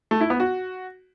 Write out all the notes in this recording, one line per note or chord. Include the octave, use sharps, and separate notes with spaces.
A3
E4
B3
F#4